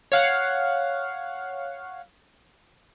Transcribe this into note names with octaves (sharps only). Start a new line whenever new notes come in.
C#5 F5 F#5